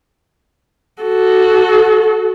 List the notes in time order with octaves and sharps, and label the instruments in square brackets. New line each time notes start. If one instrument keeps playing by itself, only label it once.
[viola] F#4 A4